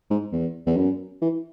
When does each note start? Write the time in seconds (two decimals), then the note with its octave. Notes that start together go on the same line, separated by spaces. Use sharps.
0.10 G#2
0.32 E2
0.66 E2
0.76 F#2
1.21 E3